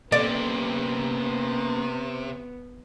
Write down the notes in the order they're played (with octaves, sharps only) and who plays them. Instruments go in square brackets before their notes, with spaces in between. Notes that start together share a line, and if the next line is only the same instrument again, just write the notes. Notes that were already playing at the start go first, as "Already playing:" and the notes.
[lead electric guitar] C3 [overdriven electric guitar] A#3 C#4 [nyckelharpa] B3 [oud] D5